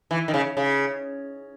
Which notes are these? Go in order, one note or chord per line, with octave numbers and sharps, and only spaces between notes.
E3
D#3
C#3
C#3